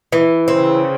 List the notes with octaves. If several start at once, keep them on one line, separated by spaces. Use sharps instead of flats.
E3
C#3 C4